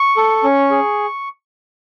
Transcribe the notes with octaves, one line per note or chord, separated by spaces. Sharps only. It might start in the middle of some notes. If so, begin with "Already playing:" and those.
Already playing: C#6
A4
C#4
G#4